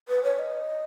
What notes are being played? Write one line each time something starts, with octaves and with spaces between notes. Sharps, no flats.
B4
C#5
D#5